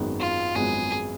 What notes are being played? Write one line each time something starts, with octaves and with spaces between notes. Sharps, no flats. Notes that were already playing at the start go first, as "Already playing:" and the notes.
Already playing: G#1 F#2 D#3 G#3 B3
F4
G#1 F#2 F3 G#3 B3 G#4